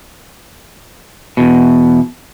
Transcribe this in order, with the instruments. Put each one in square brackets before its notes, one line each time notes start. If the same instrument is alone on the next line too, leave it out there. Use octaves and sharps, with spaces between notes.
[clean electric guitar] E2 B2